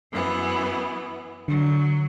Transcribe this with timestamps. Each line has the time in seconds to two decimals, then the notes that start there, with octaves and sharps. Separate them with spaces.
0.11 F#2 E3 B3
1.48 D3 F#3